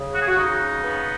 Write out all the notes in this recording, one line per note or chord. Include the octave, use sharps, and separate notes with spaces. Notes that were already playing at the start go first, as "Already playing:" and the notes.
Already playing: C#3
F#4
G#4
F#4
C#3 D#4
B3